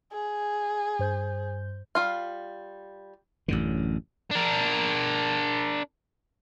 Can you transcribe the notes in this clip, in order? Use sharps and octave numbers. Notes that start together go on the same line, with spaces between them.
G#4
G2 C5 G6
G3 F4 F5
A1 F#2 D3
D4 A#4